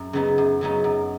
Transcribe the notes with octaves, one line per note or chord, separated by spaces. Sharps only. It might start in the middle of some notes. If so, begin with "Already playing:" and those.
Already playing: F#2
C#3 F#3 B3 D#4
F#2
C#3 F#3 B3 D#4
F#2